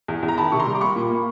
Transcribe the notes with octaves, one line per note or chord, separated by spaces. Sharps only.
E2
E2
A#5
D#3 A5 B5
C3 C#6
A#5 C6
G3
D6
A#3 B5 C#6
A#2
A#3